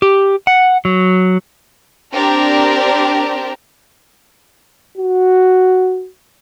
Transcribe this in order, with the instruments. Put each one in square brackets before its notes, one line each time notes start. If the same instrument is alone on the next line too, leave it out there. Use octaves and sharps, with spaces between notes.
[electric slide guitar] G4
F#5
F#3
[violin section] C4 D4 G4 A#4
[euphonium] F#4